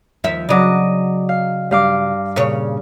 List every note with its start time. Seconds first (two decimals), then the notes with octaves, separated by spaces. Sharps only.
0.24 D#2 F3 E5
0.49 C#3 F#3 D5 D#5 D6
1.29 F5
1.71 G2 F5 D6
2.36 A#2 C#3 C#5